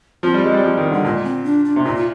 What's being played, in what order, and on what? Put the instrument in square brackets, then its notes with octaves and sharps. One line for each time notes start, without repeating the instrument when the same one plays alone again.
[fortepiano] F3 [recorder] C4
[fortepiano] G3
G#3
G3
F3
D#3
[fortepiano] D3 [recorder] G3
[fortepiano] A#2 [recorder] G#3
[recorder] C4
D4
D4
[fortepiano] C3
[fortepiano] A#2 [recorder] D#4
[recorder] F4